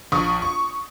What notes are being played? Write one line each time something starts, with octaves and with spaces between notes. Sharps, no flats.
A#1 C#6 D#6
C#6